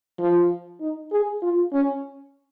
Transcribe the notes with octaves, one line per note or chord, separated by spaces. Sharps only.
F3
D#4
G#4
F4
C#4